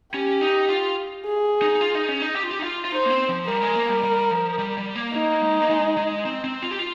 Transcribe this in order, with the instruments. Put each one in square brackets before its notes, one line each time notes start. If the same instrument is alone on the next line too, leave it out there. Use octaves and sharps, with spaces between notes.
[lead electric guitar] C#4 [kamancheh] G4
[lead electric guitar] D#4
F4
[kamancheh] G#4
[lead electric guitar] D#4
F4
D#4
C#4
D#4
G4
F4
G4
D#4
F4
F4
[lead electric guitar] D#4 [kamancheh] C5
[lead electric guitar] A#3
C4
F3
[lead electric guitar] G3 [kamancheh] A#4
[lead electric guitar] G#3
A#3
G3
G3
F3
G3
G3
A#3
[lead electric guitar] A#3 [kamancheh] D#4
[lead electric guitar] G#3
A#3
G#3
G#3
C4
C4
F4
G4
F4